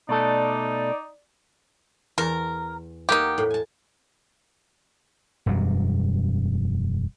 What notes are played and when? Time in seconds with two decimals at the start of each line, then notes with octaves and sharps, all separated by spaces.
0.09 B2 A3 D#4 A4 D5
2.18 E2 A#4 A5
3.09 A#3 D#4 F#4 G4
3.38 A2
3.50 G#5 A5
5.46 E1 F#2 F#3 G3